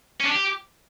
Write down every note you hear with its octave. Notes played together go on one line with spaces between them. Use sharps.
C#4
D4
G4